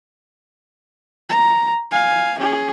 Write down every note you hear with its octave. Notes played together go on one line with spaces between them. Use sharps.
A#5
F5 G#5
C#4 G#4